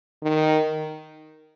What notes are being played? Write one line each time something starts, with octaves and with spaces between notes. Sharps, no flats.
D#3